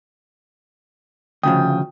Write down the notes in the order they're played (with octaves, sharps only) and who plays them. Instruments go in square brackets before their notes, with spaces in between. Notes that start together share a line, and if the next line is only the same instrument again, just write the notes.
[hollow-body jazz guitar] D2 C#3 F3 [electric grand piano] G5 D#6